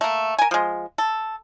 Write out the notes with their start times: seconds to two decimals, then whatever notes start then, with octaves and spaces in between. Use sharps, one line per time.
0.01 A3 A#3
0.38 A#4 G#5
0.51 F3 G#3
0.98 A4